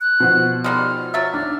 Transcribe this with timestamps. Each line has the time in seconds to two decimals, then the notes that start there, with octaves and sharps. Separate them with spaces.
0.01 F#6
0.20 B2 F3 F#4
0.64 D#3 G3 G#3 F6
1.14 F#3 E5 A6
1.34 D4 F6